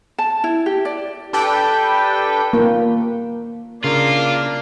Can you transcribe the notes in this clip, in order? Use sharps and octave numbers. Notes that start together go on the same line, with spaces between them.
A5
E4
G4
D5
D4 G4 A4 B4 G5
A#3
C#3 A#3 D4 F4